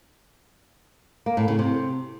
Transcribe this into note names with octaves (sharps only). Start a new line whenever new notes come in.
A#3
A2
C#3
C3